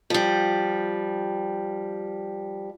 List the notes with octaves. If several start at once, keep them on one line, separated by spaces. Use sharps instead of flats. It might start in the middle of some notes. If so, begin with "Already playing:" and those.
F3 G3